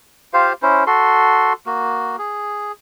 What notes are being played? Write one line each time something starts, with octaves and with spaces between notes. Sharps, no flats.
F4 G4 C5 F5
C#4 E4 C5
F#4 A4 C6
A#3 F#4
G#4